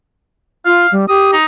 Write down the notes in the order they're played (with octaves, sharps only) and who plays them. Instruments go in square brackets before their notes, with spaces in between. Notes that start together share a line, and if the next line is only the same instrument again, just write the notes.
[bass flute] F4 [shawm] F5
[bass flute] G3
[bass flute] G4 [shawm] D#6
[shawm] D#4